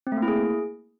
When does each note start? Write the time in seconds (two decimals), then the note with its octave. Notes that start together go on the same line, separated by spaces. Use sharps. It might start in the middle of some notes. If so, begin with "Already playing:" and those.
0.07 C4
0.12 A3
0.17 A#3
0.23 E4
0.28 G#4